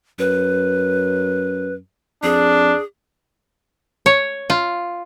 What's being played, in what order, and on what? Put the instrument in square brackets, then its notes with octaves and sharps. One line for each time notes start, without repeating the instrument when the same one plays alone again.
[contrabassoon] F#2 [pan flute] B4
[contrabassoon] F2 [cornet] D4 [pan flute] G#4
[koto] C#5
F4